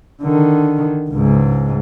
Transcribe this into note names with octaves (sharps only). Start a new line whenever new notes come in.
D3 D#3
C#2 G#2